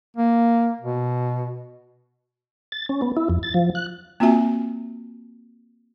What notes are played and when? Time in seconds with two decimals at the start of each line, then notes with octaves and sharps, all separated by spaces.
0.17 A#3
0.81 B2
2.72 A6
2.89 C#4
3.02 B3
3.17 E4
3.30 F2
3.43 A6
3.54 F3
3.75 F#6
4.20 A#3 C4 F4 F#4 E5 G#5